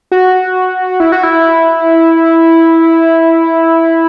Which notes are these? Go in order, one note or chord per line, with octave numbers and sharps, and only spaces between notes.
F#4
E4
F#4
E4